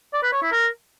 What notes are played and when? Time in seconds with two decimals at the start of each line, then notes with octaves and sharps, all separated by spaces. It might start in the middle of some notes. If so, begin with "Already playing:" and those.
0.13 D5
0.23 B4
0.32 C#5
0.42 E4
0.52 A#4